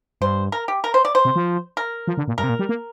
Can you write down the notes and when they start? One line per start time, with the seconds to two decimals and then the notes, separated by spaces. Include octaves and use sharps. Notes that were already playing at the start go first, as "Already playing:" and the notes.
0.21 G2 C5
0.52 A#4
0.68 G4
0.84 A#4
0.94 C5
1.05 D5
1.15 C5
1.25 C3
1.36 F3
1.77 A#4
2.07 F3
2.17 D3
2.28 A#2
2.38 G2 A#4
2.44 C3
2.49 A#2
2.59 G3
2.69 A#3